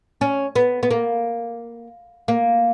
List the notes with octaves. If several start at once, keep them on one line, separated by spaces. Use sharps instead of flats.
C#4
B3
B3
A#3
A#3